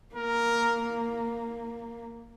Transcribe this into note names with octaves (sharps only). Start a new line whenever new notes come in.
A#3 A#4